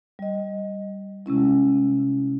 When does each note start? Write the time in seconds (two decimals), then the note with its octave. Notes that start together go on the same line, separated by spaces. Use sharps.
0.19 G3 D#5
1.26 C3 G#3 C#4 E4